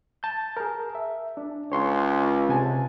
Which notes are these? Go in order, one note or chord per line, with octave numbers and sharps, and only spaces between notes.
A5 G6
G#4 A#4
E5
D4
C#2 C#5 C6 C#6
C3 G#5 A5